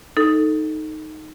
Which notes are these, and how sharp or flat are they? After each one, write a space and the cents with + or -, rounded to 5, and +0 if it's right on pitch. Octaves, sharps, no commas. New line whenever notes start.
D#4 +0 A4 +0